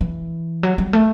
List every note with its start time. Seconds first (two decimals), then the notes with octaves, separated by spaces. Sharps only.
0.01 E3
0.63 F#3
0.78 G3
0.93 A3